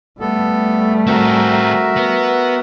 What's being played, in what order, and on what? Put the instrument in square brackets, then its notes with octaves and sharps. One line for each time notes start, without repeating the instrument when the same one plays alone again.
[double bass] G3 A3 [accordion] B3 A4
[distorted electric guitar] C4 G#4 [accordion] F#4 A#4 E5
[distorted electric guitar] B3